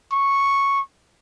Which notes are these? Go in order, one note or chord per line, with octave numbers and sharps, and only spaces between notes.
C#6